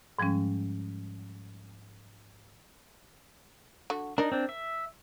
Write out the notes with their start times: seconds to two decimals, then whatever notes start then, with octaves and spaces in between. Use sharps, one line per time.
0.19 G#2 F3 G3 G#3 C#4
3.90 D3 F#4
4.18 D4 D#4 A#4
4.32 C4 D4
4.49 E5